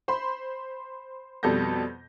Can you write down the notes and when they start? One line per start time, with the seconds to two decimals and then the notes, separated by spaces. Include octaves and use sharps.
0.08 C5 B5 C6
1.43 F2 B2 G3 A4 G6 A#6